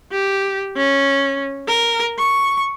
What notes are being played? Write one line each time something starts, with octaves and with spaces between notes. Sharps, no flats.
G4
C#4
A#4
C#6